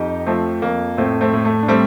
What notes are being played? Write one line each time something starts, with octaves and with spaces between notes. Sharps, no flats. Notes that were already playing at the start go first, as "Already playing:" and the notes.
Already playing: F2 D#4 G4
F3 A3 C4
F2 A#3
A2 A3 C4
A3 C4
A2
A3
D4
G3 A3 C4